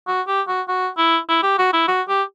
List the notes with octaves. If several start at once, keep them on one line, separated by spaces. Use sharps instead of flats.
F#4
G4
F#4
F#4
E4
E4
G4
F#4
E4
F#4
G4